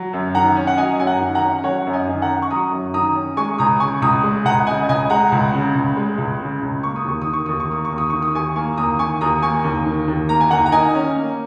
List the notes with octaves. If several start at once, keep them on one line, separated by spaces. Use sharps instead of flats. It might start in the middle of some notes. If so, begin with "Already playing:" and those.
Already playing: F#3
F#2
D#3 F#5 A#5
C#4
F#5
F#3 D#5 G#5
F#2 G#5
F#5 A#5
D#3
F#5 A#5
C#4
F#3 C#5 F#5
F#2
D#5 G#5
D#3
F#5 A#5
C#4
C#6
F#3 A#5 D#6
F#2
D#3 A#5 D#6
C#4
G#3 G#5 C#6
C#2 A#5 D#6
C#3 G#5 C#6
C#2 A#5 D#6
G#3
C#2 F#5 A#5
C#3 D#5 G#5
C#2 D#5 G#5
G#3 F#5 A#5
C#2
C#3
C#2
G#3
C#2
C#3
C#2
A#3 C#6
D#6
D#2 C#6
D#6
D#3
C#6
D#2 D#6
C#6
A#3 D#6
C#6
D#2
D#6
D#3 C#6
D#6
D#2 G#5 C#6
A#3 G#5 C#6
D#2 A#5 D#6
D#3 G#5 C#6
D#2 A#5 D#6
A#3 G#5 C#6
D#2
D#3
D#2
A#3 A#5
G#5
D#2 F#5 A#5
A#5
D#3 D#5 G#5
C#4
A#3